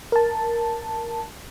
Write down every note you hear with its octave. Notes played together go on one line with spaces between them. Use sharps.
A#4 A5